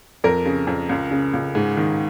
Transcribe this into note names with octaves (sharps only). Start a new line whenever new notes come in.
F2 A#4
C#3
F2
C#2
C#3
C#2
G#2
D#3